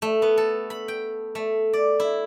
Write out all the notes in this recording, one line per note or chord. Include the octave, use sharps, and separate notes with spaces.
A3
B3
A4
B5
G5
A3
D5
E4